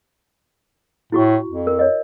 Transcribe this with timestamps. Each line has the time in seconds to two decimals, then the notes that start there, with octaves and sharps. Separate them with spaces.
1.12 A2 E4 F#4 C#6
1.48 F2
1.67 A#4
1.79 C#5 D#5